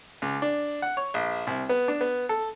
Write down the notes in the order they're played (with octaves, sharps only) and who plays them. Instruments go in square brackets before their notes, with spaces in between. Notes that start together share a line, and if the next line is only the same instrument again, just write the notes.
[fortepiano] C#2
D4
F#5
C#5
A#1
C2
B3
D4
B3
A4